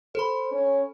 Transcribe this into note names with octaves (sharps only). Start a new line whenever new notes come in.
A4 C5 B5
C#4